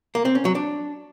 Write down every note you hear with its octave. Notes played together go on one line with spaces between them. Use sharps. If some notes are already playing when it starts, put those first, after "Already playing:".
A#3
C4
C#4
F#3
D4